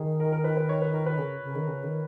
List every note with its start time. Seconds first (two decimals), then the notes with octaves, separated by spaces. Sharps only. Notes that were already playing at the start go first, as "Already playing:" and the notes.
Already playing: D#3 G#4
0.20 A#4
0.32 A#4
0.44 B4
0.57 B4
0.69 C#5
0.82 B4
0.94 A#4
1.06 B4
1.18 C#3
1.43 C#3
1.55 D#3
1.68 C#3
1.83 D#3